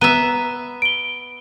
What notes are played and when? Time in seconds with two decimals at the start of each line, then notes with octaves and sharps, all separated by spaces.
0.01 B3 E5 A#5 D#7
0.82 D7 G7